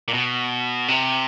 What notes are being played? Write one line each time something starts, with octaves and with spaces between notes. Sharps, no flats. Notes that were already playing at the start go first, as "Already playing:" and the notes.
A#2
B2
C3